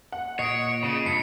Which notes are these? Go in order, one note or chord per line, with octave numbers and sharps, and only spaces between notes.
F#5
A#2 C#5 D#5 C7 D7
C#3 D#5
G2 C#7